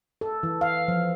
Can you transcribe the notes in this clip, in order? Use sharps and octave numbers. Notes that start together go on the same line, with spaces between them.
A4
E3
F5
F3